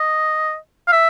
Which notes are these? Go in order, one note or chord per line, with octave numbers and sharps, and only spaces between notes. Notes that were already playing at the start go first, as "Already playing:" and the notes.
Already playing: D#5
F5
E5